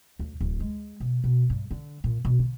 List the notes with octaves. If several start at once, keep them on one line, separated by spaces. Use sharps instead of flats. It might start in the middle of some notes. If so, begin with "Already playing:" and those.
D2
D1
G#3
B2
B2
G2
D3
A#2
B2
D3